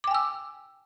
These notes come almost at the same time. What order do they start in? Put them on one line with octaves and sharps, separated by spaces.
D6 G5 G#5 E6